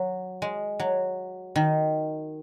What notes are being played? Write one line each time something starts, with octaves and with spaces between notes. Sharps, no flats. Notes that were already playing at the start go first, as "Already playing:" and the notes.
Already playing: F#3
G#3
F#3
D#3